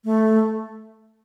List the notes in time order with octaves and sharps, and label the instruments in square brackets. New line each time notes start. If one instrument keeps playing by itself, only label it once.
[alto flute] A3